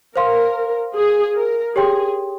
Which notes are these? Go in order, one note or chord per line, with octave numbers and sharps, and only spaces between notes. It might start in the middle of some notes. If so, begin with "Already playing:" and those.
A#4 C5 F5 C6
G#4
A#4
G4 G#4 C#5 G5 C6